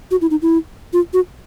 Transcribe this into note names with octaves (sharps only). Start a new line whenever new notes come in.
F#4
E4
D#4
E4
F4
F#4